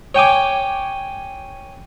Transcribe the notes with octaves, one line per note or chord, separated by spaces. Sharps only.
C#5 G5 G#5 D6